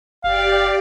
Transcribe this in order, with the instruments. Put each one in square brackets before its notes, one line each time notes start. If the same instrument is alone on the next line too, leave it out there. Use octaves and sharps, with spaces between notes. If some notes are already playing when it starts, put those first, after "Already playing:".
[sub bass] F#1 [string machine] G4 D5 [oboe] F5